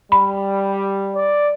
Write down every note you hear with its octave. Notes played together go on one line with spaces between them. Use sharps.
G3 B5
D5